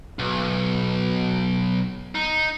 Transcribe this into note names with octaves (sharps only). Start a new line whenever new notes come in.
B1
D#4